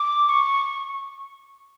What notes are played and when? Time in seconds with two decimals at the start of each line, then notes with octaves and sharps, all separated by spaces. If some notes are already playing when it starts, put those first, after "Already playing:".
Already playing: D6
0.29 C#6